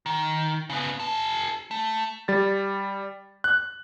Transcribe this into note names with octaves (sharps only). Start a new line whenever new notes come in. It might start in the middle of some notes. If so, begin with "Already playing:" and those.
D#3
C#3 B3
G#4 A5
A3
G3 A6
F#6